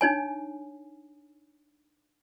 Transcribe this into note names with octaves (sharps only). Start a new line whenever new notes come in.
D4 D#4 C#5 G#5